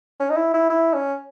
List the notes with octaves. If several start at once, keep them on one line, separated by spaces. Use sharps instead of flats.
C#4
D#4
E4
E4
E4
C#4